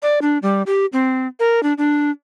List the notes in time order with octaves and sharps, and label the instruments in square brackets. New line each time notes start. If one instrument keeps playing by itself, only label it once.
[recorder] D5
D4
G3
G4
C4
A#4
D4
D4